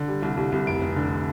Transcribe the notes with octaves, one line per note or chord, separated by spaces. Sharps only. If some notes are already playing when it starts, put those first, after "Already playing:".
Already playing: D3
G3
C2
C2
C2
F1 D7
F1
D3